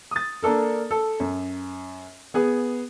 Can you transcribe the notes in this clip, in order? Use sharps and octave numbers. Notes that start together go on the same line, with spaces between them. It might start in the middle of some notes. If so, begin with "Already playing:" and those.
D#6 A6
A#3 D4 A4 A#4
A4
F#2
B3 G#4